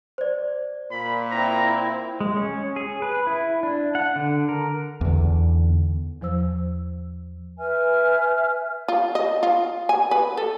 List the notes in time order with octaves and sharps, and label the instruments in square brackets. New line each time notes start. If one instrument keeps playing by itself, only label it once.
[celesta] C5 D5
[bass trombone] A#2 [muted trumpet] B5
[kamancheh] C4 E4 [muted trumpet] A#5
[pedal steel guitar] G#3
C#4
G#4
B4
E4
D4
F#5
D3
A#4
[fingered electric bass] E2 D3
[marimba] E2 F3 C5 E6
[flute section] B4 E5 G#5 F6
[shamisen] F4
D#5
F4
G#5
B4
A4